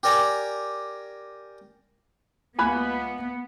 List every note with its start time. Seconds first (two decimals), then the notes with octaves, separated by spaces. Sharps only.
0.03 G4 A#4 D5 G5 G#5 A#5
2.59 C#2 A#3 B3 G#5 B5 F#6